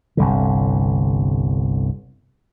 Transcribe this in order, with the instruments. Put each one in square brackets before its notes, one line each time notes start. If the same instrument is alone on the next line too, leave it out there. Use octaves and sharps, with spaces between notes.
[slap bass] G1 C2 D3